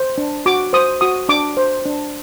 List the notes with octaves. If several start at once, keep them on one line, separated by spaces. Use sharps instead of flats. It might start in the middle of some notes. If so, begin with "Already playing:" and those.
Already playing: C5
D4
F#4 D6
C5 D#6
F#4 D#6
D4 D6
C5
D4